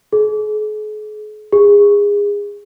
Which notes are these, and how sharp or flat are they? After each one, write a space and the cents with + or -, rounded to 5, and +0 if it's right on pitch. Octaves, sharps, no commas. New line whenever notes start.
G#4 +45
G#4 -25